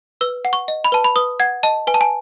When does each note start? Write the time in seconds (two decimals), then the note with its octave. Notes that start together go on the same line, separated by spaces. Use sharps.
0.21 B4 E6
0.45 F#5
0.53 C#6
0.68 D#5
0.84 B5
0.92 B4 A5
1.04 B5
1.16 B4 D#6
1.40 F#5 G#6
1.63 D#5 A5
1.87 B4 G#5
1.94 A5
2.01 G#5